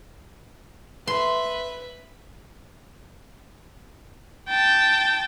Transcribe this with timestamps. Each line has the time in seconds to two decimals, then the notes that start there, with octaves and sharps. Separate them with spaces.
1.07 B4 E5 C6
4.49 G5 A5